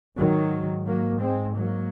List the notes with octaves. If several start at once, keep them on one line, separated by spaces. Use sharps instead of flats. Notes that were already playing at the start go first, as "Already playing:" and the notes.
G#2 D#3 F#3
F#3 A#3
G#3 C4
F#3 A#3